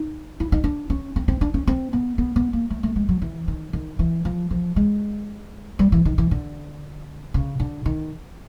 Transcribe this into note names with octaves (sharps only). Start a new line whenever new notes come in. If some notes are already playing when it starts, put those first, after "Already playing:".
Already playing: D#4
E4
D#4
D4
C#4
C4
C4
D4
C#4
C4
B3
B3
B3
A#3
A3
A3
G#3
F#3
E3
D#3
D#3
E3
F3
F3
G#3
G3
E3
D#3
E3
D3
C#3
D3
D#3